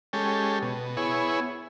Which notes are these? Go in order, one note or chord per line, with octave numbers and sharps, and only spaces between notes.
G#3 C#4 G4 A4
B2
B3 E4 G#4 C#5